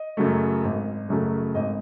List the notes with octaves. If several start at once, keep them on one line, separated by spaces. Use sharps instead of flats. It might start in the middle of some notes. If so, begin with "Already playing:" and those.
Already playing: D#5
F#2 C#3 F#3 A3
G#1
F#2 C#3 F#3 A3
G#1 D#5